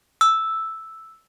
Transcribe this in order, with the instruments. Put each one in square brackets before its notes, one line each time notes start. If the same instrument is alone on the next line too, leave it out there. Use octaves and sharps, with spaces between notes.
[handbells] E6